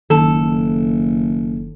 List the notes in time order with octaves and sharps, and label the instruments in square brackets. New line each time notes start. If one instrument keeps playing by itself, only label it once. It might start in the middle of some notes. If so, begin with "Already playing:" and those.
[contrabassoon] F#1 [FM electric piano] D#3 [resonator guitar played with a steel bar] A4